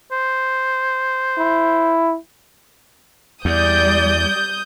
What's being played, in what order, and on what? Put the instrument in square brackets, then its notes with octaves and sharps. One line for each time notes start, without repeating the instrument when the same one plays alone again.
[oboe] C5
[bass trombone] E4
[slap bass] E2 [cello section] G3 D5 [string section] D#6 G6